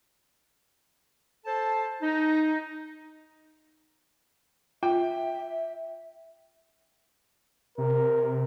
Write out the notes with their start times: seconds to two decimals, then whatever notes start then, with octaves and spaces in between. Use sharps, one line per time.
1.45 A4 C5 A5
2.02 D#4
4.83 F4 E5 G5
7.78 C3 A#4